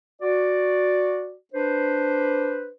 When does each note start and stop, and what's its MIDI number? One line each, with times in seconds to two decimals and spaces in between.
0.22 1.34 66
0.22 1.34 74
1.54 2.69 62
1.54 2.69 71
1.54 2.69 72